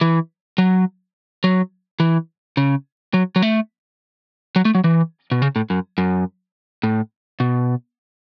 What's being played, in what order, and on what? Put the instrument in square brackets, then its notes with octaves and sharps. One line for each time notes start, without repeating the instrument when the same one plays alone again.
[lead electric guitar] E3
F#3
F#3
E3
C#3
F#3
F#3
A3
F#3
A3
F#3
E3
B2
C#3
A2
F#2
F#2
A2
B2